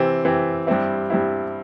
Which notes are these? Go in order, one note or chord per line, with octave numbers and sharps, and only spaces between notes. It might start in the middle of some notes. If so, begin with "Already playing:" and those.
Already playing: C3 E3 C4
C3 E3 C4
G2 G3 C4 E4
G2 G3 C4 E4